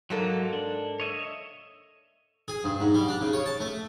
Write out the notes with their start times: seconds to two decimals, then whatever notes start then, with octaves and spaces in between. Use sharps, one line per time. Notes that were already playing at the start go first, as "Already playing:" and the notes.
0.10 G#2 F#3 A#3 A4
0.53 D4
1.00 C#5 D#5 E5
2.48 G#4
2.64 G2
2.80 G#2
2.94 G3
3.08 D4
3.21 C#3
3.33 C#5
3.46 A5
3.60 A3